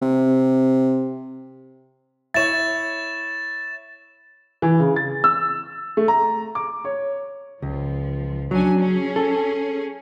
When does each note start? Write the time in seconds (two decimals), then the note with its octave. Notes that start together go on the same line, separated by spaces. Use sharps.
0.02 C3
2.34 E4 C#5 A6 E7
4.62 E3
4.80 C#3
4.96 A6
5.24 E6
5.97 A3
6.08 A#5
6.55 D6
6.85 C#5
7.62 C#2 F3
8.51 F#3 C#4 D4 G#5
8.79 C#4 G#4
9.16 A4